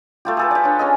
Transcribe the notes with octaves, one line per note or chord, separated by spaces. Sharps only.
A3 F4 G4
G#4 A4 B4
G4 D5
D4 C#5
C#4 G#4 D#5